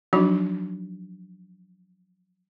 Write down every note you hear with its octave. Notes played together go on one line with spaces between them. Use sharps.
F3 F#3 D4 D#4 F#4